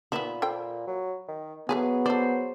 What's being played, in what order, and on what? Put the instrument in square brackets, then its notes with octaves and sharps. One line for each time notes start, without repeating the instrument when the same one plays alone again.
[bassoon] A#2 [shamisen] D#3 F3 B3 [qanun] E5 B5
[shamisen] A4 C5 G5
[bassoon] F#3
D#3
[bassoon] F#3 [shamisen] A3 B4 G#5 [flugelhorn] B3 [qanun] G#4
[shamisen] A4 D5 [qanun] C5